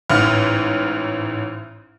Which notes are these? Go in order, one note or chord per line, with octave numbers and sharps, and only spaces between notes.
A1 G#2 F6